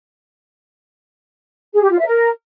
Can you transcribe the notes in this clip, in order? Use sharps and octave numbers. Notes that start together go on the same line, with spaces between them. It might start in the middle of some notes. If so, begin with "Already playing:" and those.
G#4
G4
F4
E5
A#4